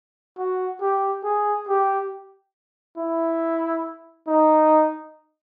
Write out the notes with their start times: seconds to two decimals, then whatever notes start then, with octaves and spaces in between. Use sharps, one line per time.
0.38 F#4
0.81 G4
1.24 G#4
1.68 G4
2.98 E4
4.27 D#4